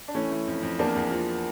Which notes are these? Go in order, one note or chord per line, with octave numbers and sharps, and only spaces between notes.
D4
E3 A3 C#4
E3
F2
F2
E2 A#3 D4
E2
F3